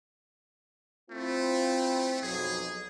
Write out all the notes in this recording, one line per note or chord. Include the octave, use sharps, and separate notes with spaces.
A3 C4 E4 F4
B1 F2 F#3 G#4